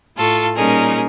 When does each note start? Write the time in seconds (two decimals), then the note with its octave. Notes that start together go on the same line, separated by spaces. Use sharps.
0.17 A2 F4 A4 C#6
0.55 A#2 G3 C#4 D#4 G#4 A#4